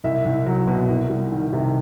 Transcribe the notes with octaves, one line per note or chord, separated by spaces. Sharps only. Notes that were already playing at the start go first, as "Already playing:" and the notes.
C2 E5
C2
F#3
B2
C2
G3
D#3
C3